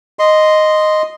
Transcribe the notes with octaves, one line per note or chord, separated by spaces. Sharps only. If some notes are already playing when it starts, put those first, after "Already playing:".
D#5 C6